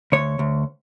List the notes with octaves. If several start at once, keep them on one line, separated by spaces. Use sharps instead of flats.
D2 C#5
D2